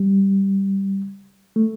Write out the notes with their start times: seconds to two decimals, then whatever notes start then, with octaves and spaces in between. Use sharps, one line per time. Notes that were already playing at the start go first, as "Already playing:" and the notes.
Already playing: G3
1.56 A3